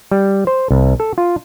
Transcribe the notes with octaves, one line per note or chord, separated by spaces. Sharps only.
G3
C5
C2
A4
F4